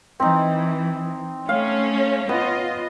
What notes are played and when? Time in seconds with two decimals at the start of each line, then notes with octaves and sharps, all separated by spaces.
0.20 E3 C4 D#4
1.49 A3 C#4 F5
2.29 B3 F4 D#5